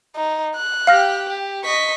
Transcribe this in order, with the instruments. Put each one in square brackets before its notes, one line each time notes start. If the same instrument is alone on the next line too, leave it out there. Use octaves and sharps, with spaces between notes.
[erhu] D#4
F#6
[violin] G4 G5 [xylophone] F5 F6 A#6
[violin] G4
[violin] D#5 B6 [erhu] C#6